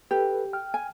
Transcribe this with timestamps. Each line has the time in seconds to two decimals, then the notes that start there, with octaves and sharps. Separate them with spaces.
0.11 G4 A4 B4
0.53 G5 F6
0.74 G#5